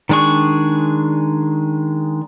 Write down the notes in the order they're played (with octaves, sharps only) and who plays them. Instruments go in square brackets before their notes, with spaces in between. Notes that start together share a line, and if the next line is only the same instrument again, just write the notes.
[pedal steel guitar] D#3 G#3 D4 G#4 C#6